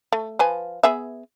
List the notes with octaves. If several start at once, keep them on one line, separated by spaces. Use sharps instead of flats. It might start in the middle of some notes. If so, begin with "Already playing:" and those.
A3
F3 B4 G#5
B3 G#4 E5